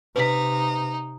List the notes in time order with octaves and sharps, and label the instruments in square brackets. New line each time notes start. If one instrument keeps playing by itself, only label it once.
[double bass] C3 [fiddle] D#4 [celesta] B4 B6